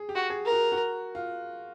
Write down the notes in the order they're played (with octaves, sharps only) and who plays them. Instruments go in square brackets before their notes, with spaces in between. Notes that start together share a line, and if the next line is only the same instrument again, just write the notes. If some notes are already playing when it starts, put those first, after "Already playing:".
Already playing: [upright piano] G#4
G4
[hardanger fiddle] F#4
[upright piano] G#4
[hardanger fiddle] A#4
[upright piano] F#4
F#4
F4